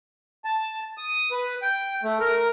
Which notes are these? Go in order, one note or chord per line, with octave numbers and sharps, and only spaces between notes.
A5
D#6
B4
G5
A3
A#4